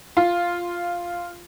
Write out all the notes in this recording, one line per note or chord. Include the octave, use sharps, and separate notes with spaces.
F4